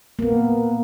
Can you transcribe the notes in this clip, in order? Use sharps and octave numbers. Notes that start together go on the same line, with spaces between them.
A#3 B3